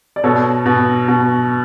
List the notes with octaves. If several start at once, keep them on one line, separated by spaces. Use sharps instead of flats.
D5
B2 A4 C#5
B2
B2